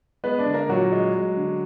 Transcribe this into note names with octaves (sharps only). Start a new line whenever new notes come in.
G#3 B3 B4
D4 D5
D3
A#3 A#4
A#2 F#3 F#4
G#3
G#3
D3